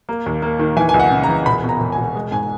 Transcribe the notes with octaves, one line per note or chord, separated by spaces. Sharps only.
A#3
D#2
A#3
D#3
E3 G#5
C#2 G#5
F#5
C#3
A#5
E3
E1 B5
B2
A#5
E1
G#5
E1
G#3
G#2 G#5